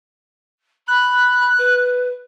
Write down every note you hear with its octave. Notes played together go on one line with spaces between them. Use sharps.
B5 F#6
B4